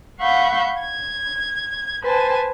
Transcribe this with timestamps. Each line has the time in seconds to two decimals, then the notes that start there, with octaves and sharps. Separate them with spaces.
0.20 F5 F#5 B5 C#6 E6 G6
0.78 G#6
2.02 B4 C5 G#5 A5